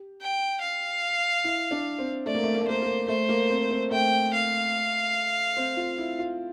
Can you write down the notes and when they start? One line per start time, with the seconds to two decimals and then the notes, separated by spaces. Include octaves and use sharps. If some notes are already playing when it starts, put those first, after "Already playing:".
Already playing: G4
0.21 G5
0.61 F5
1.44 E4
1.71 D4
1.99 C4
2.26 A3 D5
2.35 A#3
2.43 A3
2.55 A#3
2.61 A3
2.67 A#3 C5
2.82 A#3
3.08 A3 C5
3.29 A#3
3.50 C4
3.70 C4
3.91 A3 G5
4.33 F5
5.57 C4
5.77 F4
5.98 E4
6.19 F4